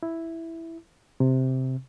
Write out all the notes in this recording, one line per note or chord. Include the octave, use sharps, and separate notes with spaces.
E4
C3